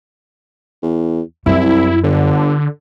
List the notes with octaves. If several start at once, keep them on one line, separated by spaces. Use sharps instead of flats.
E2
C2 F#2 E4
G1 D3